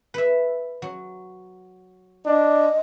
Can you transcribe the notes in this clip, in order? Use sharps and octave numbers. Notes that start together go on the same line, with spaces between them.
B4 E5
F#3
D4 D#5